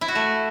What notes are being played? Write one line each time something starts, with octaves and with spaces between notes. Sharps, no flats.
E4
F#4
A3